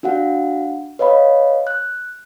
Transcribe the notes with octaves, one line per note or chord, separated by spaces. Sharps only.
D4 F#4 F5 F#5
B4 C#5 D#5 F5 B5
F#6